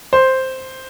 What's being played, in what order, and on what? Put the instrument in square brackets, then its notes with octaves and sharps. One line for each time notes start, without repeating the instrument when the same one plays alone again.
[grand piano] C5